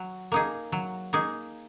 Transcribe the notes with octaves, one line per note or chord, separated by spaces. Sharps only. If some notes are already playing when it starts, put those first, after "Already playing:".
Already playing: F#3
A#3 D#4 G#4
F#3
A#3 D#4 G#4